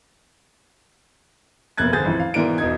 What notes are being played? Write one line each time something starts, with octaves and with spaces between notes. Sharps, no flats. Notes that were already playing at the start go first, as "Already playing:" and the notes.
F1 B2 A#3 F#6 G#6 A6
G#1 D3 G#4 G6 A6
A1 F2 E3
F5
G#2 B2 E3 A#4 D5 D7
E1 E2 D#4 G#6